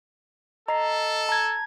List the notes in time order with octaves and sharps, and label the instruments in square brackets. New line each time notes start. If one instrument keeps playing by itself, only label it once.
[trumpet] A4 [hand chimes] D#5 C7 [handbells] A#5
[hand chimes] A5 [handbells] A#5 G#6